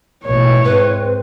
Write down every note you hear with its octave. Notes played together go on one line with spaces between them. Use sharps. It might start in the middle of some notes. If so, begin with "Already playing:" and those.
A1 B2 E4 C#5
G#2 C4 B4